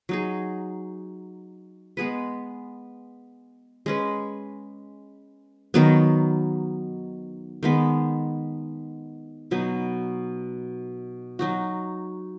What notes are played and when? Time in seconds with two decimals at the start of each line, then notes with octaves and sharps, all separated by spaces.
0.09 F#3 D#4 G#4
1.97 G#3 B3 G#4 B4
3.86 G#3 C#4 B4
5.74 D#3 F#3 B3
7.63 D#3 G#3 B3
9.51 B2 F#3 B3 D#4
11.39 F#3 D#4 F#4